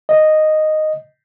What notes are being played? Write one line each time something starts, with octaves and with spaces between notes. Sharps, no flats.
D#5